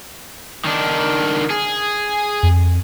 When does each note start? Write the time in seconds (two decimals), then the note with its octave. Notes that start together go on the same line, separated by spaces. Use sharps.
0.65 D#3 D4
1.50 G#4
2.43 F2